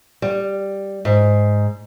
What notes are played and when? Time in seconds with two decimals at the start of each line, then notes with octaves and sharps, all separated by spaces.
0.22 G3
1.05 G#2